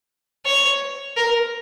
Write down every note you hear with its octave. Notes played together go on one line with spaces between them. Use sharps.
C#5
A#4